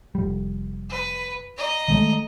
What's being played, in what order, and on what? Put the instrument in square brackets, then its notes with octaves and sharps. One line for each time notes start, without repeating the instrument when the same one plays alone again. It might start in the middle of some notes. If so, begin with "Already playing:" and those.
[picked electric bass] F1 G3
[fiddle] B4
D#5 A#5
[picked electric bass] D#3 G#3 A3